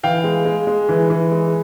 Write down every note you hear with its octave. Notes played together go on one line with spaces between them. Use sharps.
E3 F5 G5
G#3
G#3
G#3
E3
E3
G#3